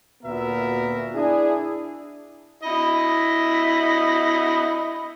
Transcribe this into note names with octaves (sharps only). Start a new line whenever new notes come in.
D2 A#2 B3 F#4 A#4 E5
D4 E4 G#4
E4 D#5